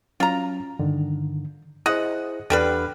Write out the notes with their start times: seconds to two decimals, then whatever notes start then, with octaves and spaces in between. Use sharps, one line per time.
0.20 F#3 C#4 F4 A#5
0.79 G2 D3 D#3
1.86 E4 G#4 C5 D#5 F#5
2.50 E2 D3 G3 B4 G5 F6